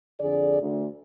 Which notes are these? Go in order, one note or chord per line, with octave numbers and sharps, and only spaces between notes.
F2 D3 G#4 D5
D2